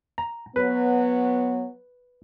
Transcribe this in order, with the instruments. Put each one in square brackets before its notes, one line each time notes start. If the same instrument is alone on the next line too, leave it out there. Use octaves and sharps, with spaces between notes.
[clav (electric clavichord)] A#5
[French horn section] F#3 B3 [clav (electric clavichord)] B4